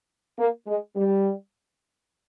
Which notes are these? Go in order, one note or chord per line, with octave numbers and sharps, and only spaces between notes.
A#3
G#3
G3